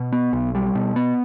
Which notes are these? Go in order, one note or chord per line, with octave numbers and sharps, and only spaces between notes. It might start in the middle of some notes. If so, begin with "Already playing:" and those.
Already playing: B2
B3
B1
G3
B2
B3